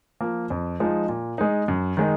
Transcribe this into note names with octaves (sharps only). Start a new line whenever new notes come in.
F3 A#3
F2
F3 G#3 D#4
A#2
G#3 D#4
F#2
D#3 G#3 D#4